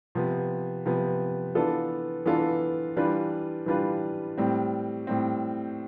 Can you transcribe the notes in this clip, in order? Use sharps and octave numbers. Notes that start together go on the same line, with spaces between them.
C3 F3 B3
C3 F3 B3
E3 B3 D4 F4 A4
E3 B3 D4 F4 A4
E3 G3 D4 F4 B4
E3 G3 D4 F4 B4
A2 G3 C4
A2 G3 C4